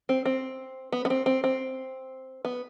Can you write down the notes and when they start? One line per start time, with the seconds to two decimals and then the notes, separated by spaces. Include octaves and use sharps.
0.09 C4
0.25 C4
0.92 B3
1.05 B3
1.10 C4
1.26 C4
1.44 C4
2.45 B3